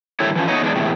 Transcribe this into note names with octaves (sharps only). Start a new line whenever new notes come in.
D3 D#3 G3 A3 E4 C#5
E3 F3 C#4
A3 B3 D#4 C#5 D#5
E2 G#3 D4
E2 A2 C3